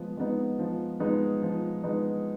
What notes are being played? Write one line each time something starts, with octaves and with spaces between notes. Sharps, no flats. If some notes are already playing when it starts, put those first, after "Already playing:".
Already playing: F3 G#3 B3
G#3 B3 D#4
F3
G#3 B3 D#4
F3
G#3 B3 D#4